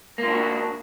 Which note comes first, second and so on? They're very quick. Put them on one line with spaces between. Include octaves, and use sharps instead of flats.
A#3 F4 D4 F#4